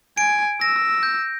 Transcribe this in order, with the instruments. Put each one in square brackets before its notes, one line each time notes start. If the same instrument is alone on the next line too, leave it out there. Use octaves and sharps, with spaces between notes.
[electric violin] G#5 [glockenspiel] D7
[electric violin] E6 [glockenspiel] A#6
[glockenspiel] G6